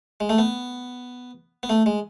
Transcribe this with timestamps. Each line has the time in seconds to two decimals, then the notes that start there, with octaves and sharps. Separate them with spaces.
0.20 G#3
0.29 A3
0.38 B3
1.63 B3
1.69 A3
1.86 G#3